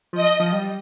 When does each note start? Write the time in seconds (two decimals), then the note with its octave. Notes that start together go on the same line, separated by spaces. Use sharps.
0.13 F3 D#5
0.40 F3
0.52 G3